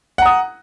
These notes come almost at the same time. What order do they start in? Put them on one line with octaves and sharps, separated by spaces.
F#5 A#5 D#6